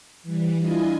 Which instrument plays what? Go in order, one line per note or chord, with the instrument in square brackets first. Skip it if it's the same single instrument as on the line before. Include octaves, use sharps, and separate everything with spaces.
[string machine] E3 G3
D4 E4 F4 D#5 G#5